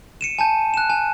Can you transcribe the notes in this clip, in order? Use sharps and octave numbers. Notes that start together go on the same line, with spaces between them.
C#7 D#7 E7
G#5 A5 G6
F#6 E7
G#5